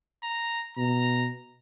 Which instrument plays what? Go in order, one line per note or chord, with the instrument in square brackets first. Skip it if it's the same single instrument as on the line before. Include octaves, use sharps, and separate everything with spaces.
[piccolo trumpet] A#5
[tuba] B2 [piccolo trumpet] A#5